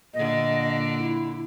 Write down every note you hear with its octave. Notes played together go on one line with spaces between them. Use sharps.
A#2 D3 D#5
E4